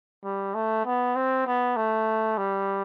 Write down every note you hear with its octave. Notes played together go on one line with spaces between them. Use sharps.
G3
A3
B3
C4
B3
A3
G3